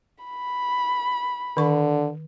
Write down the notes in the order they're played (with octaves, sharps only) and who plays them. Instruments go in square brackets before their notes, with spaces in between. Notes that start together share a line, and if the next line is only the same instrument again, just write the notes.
[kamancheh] B5
[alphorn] D3 [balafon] D#3 C#6